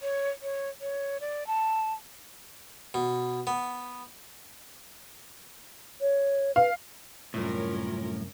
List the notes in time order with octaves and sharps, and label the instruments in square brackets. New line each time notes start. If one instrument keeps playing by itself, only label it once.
[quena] C#5
C#5
C#5
D5
A5
[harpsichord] B2
B3
[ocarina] C#5
[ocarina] B4 [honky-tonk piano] F5
[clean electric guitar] C2 F#2 [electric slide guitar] A2 [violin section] C#4 A#4 [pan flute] F4